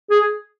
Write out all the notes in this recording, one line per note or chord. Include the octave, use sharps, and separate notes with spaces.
G#4